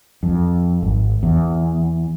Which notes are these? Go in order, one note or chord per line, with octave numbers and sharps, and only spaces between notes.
F2
G#1
E2